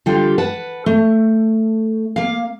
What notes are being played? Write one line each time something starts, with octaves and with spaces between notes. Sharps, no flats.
D3 G3 F4 G4
B4 F#5 A5
A3
A#3 F5